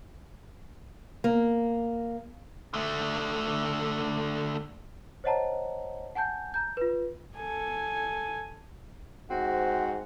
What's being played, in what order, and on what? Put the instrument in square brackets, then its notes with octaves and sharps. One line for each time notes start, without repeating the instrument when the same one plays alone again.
[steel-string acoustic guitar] A#3
[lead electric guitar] D3 A3
[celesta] C5 C#5 D#5 F#5 A5 A#5
F#5 G#5 A5 G6
A#5 G6
F4 B4
[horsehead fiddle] A4 G#5
[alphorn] G#2 [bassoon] C4 [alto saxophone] F#4